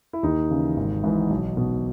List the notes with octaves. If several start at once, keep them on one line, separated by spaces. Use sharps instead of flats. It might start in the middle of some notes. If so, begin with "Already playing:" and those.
E4
D#2 D#4
C#3 E3
G#1
G#2 E3
B1
B2